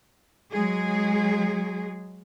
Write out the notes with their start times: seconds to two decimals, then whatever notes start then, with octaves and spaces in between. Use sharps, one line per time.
0.53 F#3 G#3 G#4